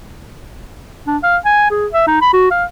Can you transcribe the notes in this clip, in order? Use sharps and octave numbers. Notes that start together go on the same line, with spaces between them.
D4
F5
G#5
G#4
E5
D#4
B5
F#4
F5